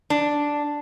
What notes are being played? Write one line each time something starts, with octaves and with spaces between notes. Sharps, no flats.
D4